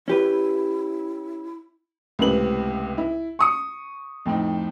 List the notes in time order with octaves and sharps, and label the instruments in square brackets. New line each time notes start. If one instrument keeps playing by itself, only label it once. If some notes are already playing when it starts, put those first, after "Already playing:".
[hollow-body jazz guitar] C#4 G4 B4 [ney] E4
[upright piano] C#2 A2 C3 C4 B4 F#7
E4
C#6 D#6 C#7
F2 A2 C4 D#4